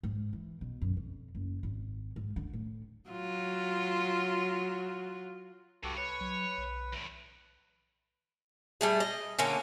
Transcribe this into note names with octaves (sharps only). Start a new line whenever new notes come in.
G#2
E3
B2
F#2
F2
F#1
G#1
G#2
D3
A2
F#3 F4
C2 G2 F#4 G4 A4
B4 C#5
F#3
B1
E2 A2
G3 A3 G#4
D#5
D3 A#3 C#4